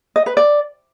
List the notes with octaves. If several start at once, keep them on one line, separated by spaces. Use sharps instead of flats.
D#5
B4
D5